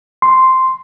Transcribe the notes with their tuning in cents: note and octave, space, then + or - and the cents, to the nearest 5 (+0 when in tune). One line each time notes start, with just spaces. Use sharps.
C6 -5